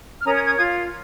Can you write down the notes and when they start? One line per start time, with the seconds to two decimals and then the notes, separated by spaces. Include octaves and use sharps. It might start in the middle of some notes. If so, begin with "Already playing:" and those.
0.21 F6
0.25 C#4 A#4 C#5 A#5 D#6
0.35 D#6 G#6
0.46 D#6 G#6
0.57 F4 D#6 G#6